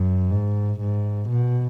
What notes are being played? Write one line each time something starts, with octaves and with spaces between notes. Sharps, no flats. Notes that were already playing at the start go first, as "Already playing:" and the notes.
Already playing: F#2
G#2
G#2
B2